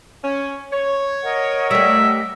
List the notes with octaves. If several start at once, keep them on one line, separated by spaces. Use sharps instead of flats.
C#4
C#5
A#4 D#5 F#5
G3 A3 E5